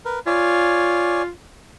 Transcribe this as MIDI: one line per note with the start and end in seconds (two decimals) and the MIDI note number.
0.05 0.19 70
0.05 0.19 71
0.27 1.29 65
0.27 1.23 73
0.27 1.23 74
0.27 1.23 80